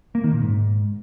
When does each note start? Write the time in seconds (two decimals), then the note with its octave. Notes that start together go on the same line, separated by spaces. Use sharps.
0.15 A#3
0.24 D#3
0.33 A#2
0.42 G#2